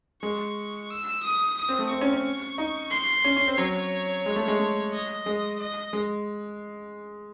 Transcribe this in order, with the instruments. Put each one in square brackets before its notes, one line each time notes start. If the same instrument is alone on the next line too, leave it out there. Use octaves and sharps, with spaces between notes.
[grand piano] G#3 [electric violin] C#6
[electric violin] E6
D#6
D#6
[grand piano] C4
A3
[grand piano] C4 [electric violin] C#6
[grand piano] C#4
C#4
D#4
[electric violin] C6
[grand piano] C#4
C#4
C4
[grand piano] F#3 [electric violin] C#5
[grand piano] G#3
A3
G#3
A3
[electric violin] D#5
[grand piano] G#3
[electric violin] D#5
[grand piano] G#3